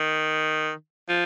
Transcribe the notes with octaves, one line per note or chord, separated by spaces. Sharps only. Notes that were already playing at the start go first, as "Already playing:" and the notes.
Already playing: D#3
F3